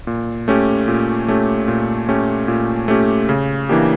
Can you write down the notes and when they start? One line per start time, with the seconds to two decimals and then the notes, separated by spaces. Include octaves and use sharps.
0.07 A#2
0.48 A3 C#4 G4
0.88 A#2
1.28 A3 C#4 G4
1.68 A#2
2.08 A3 C#4 G4
2.48 A#2
2.88 A3 C#4 G4
3.29 C#3
3.69 E3 A#3 D4 G4